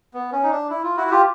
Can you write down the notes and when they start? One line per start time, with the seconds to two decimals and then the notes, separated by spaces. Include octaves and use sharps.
0.14 B3
0.32 C#4
0.43 D#4
0.51 D4
0.70 E4
0.83 F4
0.97 E4 F#4
1.08 F#4
1.11 F4 G4